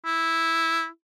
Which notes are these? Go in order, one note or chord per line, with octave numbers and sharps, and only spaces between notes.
E4